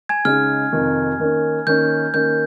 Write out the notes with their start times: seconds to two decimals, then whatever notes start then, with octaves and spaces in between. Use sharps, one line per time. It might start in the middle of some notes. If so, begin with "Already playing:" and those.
0.09 G#5 G#6
0.25 C#3 G#3 D#4 F6
0.72 F2 C3 D#3
1.20 D#3 A#3 C#4
1.67 D#3 A#3 C#4 G6
2.14 D#3 A#3 C#4 G6